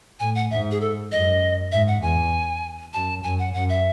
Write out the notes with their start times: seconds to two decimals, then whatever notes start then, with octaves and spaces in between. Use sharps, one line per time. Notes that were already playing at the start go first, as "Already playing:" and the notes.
0.20 A2 G#5
0.35 F#5
0.51 G#2 E5
0.71 G#4
0.81 A4
1.12 F#2 D#5
1.72 G#2 E5
1.88 F#5
2.02 E2 G#5
2.93 F#2 A5
3.24 F#2 G#5
3.39 F#5
3.54 F#2 F#5
3.69 E5